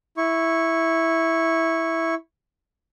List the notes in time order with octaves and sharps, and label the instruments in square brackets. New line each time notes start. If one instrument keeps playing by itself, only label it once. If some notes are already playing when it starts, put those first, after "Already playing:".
[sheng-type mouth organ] E4 C#6